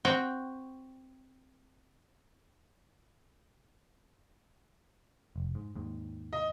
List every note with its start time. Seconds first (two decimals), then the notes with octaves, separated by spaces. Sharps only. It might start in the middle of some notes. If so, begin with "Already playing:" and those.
0.05 C4 F#4 G5
5.36 F1
5.55 G#2
5.75 D#2 G#2
6.33 D#5